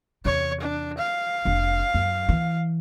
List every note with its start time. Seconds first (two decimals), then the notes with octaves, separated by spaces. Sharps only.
0.25 E2 C3 C#5
0.61 D4
0.98 F5
1.45 F1 D4
1.94 F#2
2.28 E3